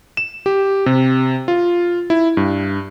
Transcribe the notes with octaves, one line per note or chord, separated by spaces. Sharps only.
E7
G4
C3
F4
E4
G2